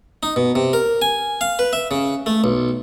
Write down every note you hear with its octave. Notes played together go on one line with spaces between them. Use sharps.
D#4
B2
C3
A#4
G#5
F5
B4
E5
C#3
A3
B1